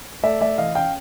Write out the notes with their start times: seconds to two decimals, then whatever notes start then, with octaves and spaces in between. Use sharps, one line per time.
0.23 A3 D5 E5
0.41 A3 D5 E5
0.58 E3 D#5 F5
0.75 C#4 F5 G5